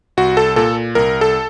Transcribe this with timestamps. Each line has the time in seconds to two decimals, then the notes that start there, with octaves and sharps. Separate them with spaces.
0.17 C2 F#4
0.37 A4
0.56 A#2 A4
0.95 C2 A#4
1.21 A4